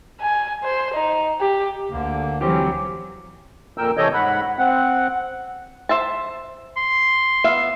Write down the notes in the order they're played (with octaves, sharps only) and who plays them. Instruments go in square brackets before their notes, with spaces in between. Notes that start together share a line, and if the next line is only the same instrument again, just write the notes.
[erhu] G#5
C5
D#4
G4
[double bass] D2 [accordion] D3 A#3
[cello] E3 F#3 [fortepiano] C4 G4 [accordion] C#4
[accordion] F2 A#2 A#4 G5 E6
C3 E3 A4 C#5 D#5 G6
G#2 F#5 B5
C4 F#5
[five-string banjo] C5 E5 A5
[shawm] C6
[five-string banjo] B3 E5 F5